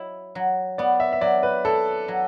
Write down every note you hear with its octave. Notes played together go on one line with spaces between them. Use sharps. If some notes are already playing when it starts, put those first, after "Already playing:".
Already playing: F#3 E4
F#3
B3 D5
E5
E5
F#3 D5
B4
E4 A4
F#3